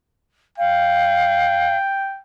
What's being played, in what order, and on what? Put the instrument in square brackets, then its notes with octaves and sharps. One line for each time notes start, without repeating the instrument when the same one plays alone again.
[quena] F5 [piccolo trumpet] G5